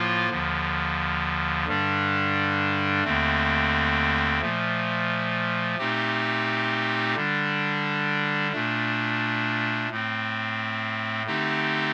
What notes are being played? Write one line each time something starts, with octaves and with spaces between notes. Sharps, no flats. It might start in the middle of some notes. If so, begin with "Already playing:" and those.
Already playing: A2 F3 A#3 F4
D#2 D3 F3
G2 D3 G3 D4
D#2 D3 A3 C4
A#2 F3 A3
A#2 A3 C4 D#4 G4
D3 G3 D4
A#2 A3 D4
A2 A3 C4
D3 A3 C4 D#4 G4